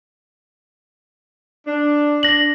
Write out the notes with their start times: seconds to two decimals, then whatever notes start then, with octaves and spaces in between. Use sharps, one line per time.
1.67 D4
2.23 D4 A#6 F#7